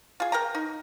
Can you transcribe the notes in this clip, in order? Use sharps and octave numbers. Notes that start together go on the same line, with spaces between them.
F4 G#4
A#4 G5 A#5
D#4